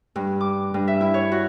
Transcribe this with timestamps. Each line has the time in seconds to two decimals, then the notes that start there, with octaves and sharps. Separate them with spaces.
0.16 G2
0.41 D6
0.74 G2
0.88 E5
1.01 E4
1.14 C#5
1.32 F#4